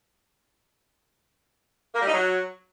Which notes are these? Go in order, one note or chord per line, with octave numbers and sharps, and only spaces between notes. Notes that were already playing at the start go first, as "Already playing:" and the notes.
A#3
G3
D#4
F#3